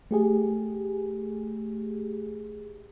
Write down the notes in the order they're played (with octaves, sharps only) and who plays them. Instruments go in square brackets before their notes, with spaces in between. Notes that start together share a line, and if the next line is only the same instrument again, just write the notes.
[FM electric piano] A3 G4 G#4